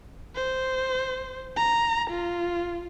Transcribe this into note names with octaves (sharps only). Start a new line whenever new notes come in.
C5
A#5
F4